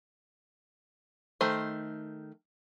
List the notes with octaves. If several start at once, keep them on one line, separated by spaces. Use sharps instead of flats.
D#3 A3 C5